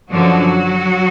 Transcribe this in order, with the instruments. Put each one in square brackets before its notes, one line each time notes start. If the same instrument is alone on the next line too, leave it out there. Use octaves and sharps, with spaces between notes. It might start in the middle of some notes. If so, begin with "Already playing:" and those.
[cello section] F#2 D3 F3 F#3 F#4